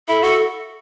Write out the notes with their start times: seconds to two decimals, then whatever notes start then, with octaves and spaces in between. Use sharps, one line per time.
0.09 E4 A4
0.22 F#4 A4